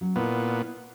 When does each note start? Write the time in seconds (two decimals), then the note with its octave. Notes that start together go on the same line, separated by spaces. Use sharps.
0.01 F#3 C#4
0.16 A#2 B3 D#4 E4